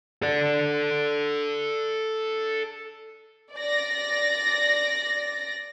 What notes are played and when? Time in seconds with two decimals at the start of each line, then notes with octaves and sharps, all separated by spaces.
0.22 A4 D5
3.57 D5 A#6